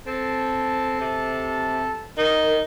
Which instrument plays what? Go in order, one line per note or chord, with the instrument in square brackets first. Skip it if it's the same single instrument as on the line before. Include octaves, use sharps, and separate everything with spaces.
[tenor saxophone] C4 [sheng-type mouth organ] A4 A5
[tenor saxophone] C3
[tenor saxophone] D#4 [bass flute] A#4